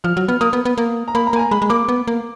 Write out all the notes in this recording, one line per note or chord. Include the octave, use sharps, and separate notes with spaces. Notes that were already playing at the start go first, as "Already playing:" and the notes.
F3 F6
F#3
B3 F6
A#3 D#6
B3
B3
A#3
A#5
A#3 B5
A#5
A#3 G#5
A#5
G#3 B5
G#3
A#3 D6
B3
A#3